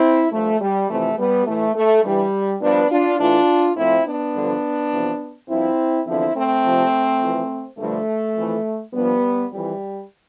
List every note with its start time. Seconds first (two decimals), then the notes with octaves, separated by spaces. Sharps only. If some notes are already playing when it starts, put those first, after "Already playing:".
Already playing: C4 E4
0.32 G2 F3 A3
0.60 G3
0.89 F2 C3 E3 A3
1.18 G3 B3
1.47 A2 E3 A3
1.75 A3
2.04 G2 E3 G3
2.61 G2 F3 B3 D4
2.90 D4 F4
3.19 A2 E3 D4 F4
3.76 A2 F3 C4 E4
4.05 B3 D4
4.34 G2 D3 F3
4.92 E2 C3 F3
5.49 G2 F3 C4 E4
6.06 E2 D3 F3 C4 E4
6.35 A3 C4
6.64 F2 C3 F3
7.21 F2 E3
7.78 G2 D3 F3 A3
8.36 F2 E3
8.93 G2 F3 G3 B3
9.51 F2 E3 G3